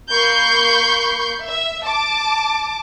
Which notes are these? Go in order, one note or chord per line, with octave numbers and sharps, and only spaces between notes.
A#3 B5 C#6 G6 C7
E5
A5 D6